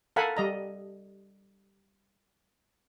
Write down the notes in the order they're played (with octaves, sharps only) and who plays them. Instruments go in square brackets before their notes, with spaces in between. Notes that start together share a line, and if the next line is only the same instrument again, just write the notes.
[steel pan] A4 A#4 F5 F#5 G#5 B5
G3 D#5 A#5